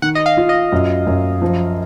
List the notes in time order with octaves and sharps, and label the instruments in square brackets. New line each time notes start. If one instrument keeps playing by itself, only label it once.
[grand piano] D#3 [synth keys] F#5
[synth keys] D#5
F5
[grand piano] F4
[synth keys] D#5
[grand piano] F#2
F#2
F3